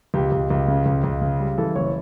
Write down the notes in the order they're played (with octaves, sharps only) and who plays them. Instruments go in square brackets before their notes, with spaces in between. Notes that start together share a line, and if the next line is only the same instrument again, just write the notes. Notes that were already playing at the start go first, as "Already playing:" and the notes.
[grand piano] C#2 G4
C#2
C#2
C#3
C#2
C#2
C#3
G3
E3 A4
F#1 C#5